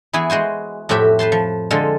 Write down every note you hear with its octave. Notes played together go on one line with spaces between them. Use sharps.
E3 B3 E4 G#4
G#3 F#4 C5 G#5
F2 A2 C4 F#4 G4 E5
B4 C5 A5 C6
F3
D3 G#3 F4 A4